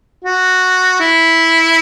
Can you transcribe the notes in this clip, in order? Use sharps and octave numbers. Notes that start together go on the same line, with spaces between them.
F#4
E4